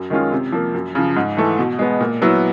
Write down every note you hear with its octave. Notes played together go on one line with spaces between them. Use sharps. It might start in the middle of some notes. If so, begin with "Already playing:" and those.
Already playing: F#2
D#3 G#3 C#4 F4
C3
F3 A#3
F#2
C#3 F3
G#2
E3 A3
B2
G#3 B3
A#2
F#3 B3 E4